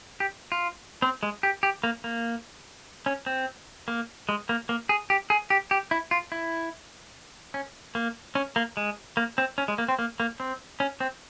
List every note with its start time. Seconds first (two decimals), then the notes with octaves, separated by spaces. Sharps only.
0.20 G4
0.52 F4
1.02 C4
1.23 G#3
1.43 G4
1.63 G4
1.84 A#3
2.04 A#3
3.06 C#4
3.26 C4
3.88 A#3
4.29 G#3
4.49 A#3
4.69 A#3
4.89 G#4
5.10 G4
5.30 G#4
5.50 G4
5.71 G4
5.91 E4
6.11 F4
6.32 E4
7.54 C#4
7.95 A#3
8.35 C#4
8.56 A#3
8.77 G#3
9.17 A#3
9.38 C4
9.58 C#4
9.68 G#3
9.78 A#3
9.89 C4
9.99 A#3
10.20 A#3
10.40 C4
10.80 C#4
11.00 C4